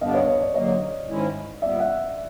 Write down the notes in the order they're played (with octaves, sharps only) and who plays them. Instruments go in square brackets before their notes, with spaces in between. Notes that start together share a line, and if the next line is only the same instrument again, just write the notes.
[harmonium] G2 D3 G3 B3 D4 [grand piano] D#5 F5
[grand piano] C#5 D#5
C#5
D5
[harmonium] D3 F#3 A#3 [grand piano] C#5 D#5
[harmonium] G#2 D#3 G#3 C#4 E4
[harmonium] A#2 G3 B3 [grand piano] D5 E5
[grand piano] E5 F#5